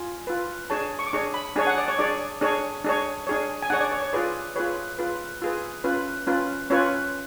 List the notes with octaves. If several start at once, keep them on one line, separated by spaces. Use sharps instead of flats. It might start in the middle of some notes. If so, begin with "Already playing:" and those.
Already playing: F4 G#5
F4 B4
D4 G#4 C#5 A5
C#6
D6
D4 G#4 C#5 C#6
B5
D4 G#4 C#5 G#5
F#5
D5
C#5
D4 G#4 C#5 D5
D4 G#4 C#5
D4 G#4 C#5
D4 G#4 C#5
G#5
D4 G#4 C#5 F#5
D5
C#5
C#5
F4 G#4 B4 D5
F4 G#4 B4 C#5
F4 G#4 B4
F4 G#4 B4
C#4 F4 B4
C#4 F4 B4
C#4 F4 B4 C#5